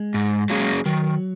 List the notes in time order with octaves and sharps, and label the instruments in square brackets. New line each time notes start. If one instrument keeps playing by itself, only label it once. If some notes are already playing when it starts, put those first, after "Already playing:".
Already playing: [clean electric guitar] G#3
[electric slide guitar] G#2
F#3 A#3 C#4 G#4
[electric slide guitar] D#3 [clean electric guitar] F#3